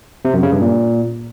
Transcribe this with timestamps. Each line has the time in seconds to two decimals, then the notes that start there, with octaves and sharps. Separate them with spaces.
0.25 C3
0.34 F#2
0.43 C#3
0.52 G2
0.61 A#2